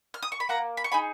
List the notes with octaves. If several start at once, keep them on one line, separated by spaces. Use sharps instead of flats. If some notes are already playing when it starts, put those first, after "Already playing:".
F6
D#6
C#6
B5
A#3 F#5 A#5
B5
C#6
D#4 G#4 G#5 B5